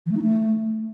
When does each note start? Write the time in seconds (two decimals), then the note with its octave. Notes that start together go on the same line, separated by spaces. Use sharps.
0.06 E3
0.11 A3
0.17 D#4
0.22 A3